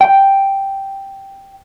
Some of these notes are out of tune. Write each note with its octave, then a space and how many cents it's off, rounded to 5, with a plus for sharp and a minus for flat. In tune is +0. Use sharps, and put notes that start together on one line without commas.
G5 +0